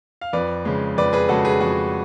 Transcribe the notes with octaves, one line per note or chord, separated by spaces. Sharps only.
F5
F2 B4 D5
C#3 G#3
F2 B4 D5
G#4 B4
C#3 G#3 F#4 A4
G#4 B4
F2 F#4